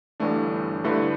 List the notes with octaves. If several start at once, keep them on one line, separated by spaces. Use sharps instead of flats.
G1 G2 E3 A3 D4
G2 D3 A3 E4 B4